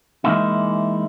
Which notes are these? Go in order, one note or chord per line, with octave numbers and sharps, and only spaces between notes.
E3 F3 G#3 A#3 D#4 E4